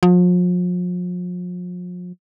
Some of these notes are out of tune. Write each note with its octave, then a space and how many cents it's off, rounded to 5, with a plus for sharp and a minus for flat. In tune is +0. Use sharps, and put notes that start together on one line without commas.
F3 +40